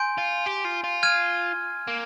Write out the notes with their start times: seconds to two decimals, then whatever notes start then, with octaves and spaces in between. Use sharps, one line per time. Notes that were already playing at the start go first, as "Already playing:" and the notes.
Already playing: G#5 C6 G6 D7
0.18 F4
0.46 G4
0.65 F4
0.84 F4
1.03 F6 G#6 D#7
1.88 A#3